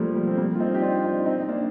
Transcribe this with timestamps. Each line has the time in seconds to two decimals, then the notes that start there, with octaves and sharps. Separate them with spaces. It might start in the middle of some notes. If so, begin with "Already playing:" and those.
Already playing: F3 G3 A3 A#3
0.15 G3
0.27 C4
0.37 G3 A#3
0.55 F4
0.60 C4 D#4
0.74 G4
0.82 D4 F4
1.04 C4 D#4
1.26 C4 D#4
1.48 A#3 D4